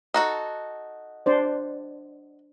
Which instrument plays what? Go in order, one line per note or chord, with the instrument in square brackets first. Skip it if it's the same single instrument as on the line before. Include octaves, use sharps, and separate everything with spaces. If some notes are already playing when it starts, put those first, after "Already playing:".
[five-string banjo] D#4 F#4 A4
[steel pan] D4 C5 D5